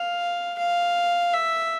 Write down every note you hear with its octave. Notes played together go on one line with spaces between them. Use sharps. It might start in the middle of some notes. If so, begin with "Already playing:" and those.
Already playing: F5
F5
E5